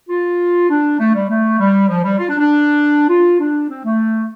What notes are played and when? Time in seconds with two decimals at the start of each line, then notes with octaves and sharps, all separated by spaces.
0.09 F4
0.70 D4
1.00 A3
1.14 G3
1.30 A3
1.59 G3
1.89 F3
2.04 G3
2.19 F4
2.29 D4
2.39 D4
3.09 F4
3.40 D4
3.69 C4
3.85 A3